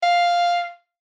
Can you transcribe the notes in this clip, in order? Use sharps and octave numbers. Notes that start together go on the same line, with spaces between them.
F5